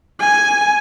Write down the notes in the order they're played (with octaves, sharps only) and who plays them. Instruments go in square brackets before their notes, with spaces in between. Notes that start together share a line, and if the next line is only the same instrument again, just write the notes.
[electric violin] G#5